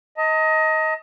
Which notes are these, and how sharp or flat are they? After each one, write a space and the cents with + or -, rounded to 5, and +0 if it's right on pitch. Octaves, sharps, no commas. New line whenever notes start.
D#5 +20 A5 +40